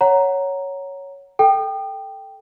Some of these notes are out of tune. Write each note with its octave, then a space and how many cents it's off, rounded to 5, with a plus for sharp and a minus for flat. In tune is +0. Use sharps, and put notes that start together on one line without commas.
C#5 +0 F#5 +5 A#5 +0
A4 +0 G5 +0